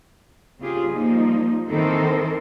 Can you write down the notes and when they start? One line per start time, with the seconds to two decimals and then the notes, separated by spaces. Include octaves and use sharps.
0.59 C#3 C4 F4 G4 G#4
0.88 F3 G3 A#3 D#4
1.70 D#3 E3 C4 A4 A#4 C5